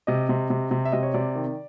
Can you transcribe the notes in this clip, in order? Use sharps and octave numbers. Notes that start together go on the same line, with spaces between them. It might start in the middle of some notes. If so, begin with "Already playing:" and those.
C3 D#5
C3
C3
C3
E5
C3 D#5
C#5
C3 D5
D#3